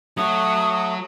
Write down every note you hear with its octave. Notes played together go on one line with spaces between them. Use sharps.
F#3 A3 F#4 D#6